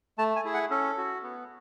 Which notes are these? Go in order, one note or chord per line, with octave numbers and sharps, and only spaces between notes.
A3 A5
G#5
E4 G#4
F#5
C#4 A4
F#4
B3